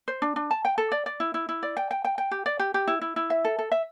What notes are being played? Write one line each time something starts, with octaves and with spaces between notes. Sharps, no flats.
C5
D4
D4
A5
G5
A4
D5
D5
E4
E4
E4
D5
G5
G5
G5
G5
G4
D5
G4
G4
E4
E4
E4
E5
A4
A4
E5